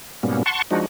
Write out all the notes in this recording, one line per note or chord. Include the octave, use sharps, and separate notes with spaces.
G#2 B2 G3 A#3 B3 C#4
F#5 A5 C6 C#6
F3 G#3 D4 D#4 F#4